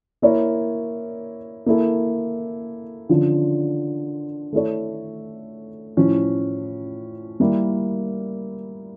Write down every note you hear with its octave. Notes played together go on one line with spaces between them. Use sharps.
A#3 E4 A#4 C#5
A#3 E4 A4
D3 F3 C#4 F4
A3 E4 A4 C#5
A2 F3 C#4
G3 A#3 E4 A#4